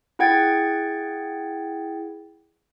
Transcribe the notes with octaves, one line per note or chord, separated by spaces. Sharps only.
E4 G#4 F#5 G5 G#6 A6